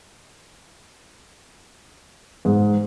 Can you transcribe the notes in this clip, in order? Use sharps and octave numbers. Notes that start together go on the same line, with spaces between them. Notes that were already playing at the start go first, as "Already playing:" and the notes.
G#2